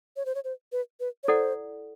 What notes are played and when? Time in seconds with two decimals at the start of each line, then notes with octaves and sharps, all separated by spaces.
0.16 C#5
0.26 C5
0.35 C#5
0.44 C5
0.72 B4
1.00 B4
1.23 C#5
1.28 E4 A4 C5 D5 F#5